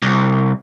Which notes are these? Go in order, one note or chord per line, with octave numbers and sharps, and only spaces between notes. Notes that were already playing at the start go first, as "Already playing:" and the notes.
C2